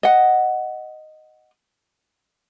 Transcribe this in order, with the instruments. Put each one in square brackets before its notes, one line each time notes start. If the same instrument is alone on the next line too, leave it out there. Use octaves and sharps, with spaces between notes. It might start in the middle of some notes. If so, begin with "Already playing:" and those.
[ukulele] D#5 F#5